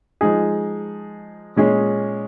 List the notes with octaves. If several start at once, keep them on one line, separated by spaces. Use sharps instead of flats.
F3 G#3 D#4 G#4
A#2 G#3 C#4 G#4